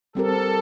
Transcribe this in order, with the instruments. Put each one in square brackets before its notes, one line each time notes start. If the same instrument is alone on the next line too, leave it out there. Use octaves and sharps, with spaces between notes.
[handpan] G3 C4 G4 A#4 [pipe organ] A4